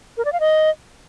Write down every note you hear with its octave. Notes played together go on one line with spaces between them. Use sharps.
A#4
D5
F5
D#5